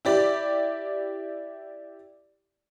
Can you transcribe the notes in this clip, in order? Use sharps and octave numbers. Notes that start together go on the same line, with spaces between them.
E4 G4 D5